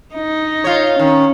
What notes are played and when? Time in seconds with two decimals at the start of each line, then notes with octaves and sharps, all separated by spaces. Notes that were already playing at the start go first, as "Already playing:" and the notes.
0.15 D#4
0.64 F4 C#5
0.99 D#3 C#4